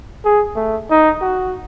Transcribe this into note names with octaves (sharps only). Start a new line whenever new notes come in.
G#4
A3
D#4
F#4